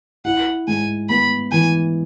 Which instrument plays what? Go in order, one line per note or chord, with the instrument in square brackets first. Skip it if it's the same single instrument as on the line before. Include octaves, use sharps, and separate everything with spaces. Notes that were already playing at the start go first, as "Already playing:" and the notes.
[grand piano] E4 [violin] F#5
[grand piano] G#2 [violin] G#5
[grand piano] B3 [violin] B5
[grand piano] E3 [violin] G#5